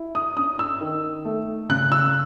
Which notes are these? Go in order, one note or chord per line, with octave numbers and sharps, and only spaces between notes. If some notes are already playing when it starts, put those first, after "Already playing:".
Already playing: E4
D#6
C#4 D#6
E6
D#3
A3
C#3 F#6
E6